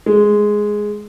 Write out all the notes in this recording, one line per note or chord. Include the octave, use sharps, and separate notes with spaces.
G#3